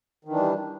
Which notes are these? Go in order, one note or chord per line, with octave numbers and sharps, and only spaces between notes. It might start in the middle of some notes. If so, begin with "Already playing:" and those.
D#3 E3 G3 D4